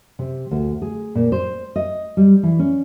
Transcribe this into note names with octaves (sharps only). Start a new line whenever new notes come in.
C3
D2
G#4
A#2
C5
D#5
G3
E3
C#4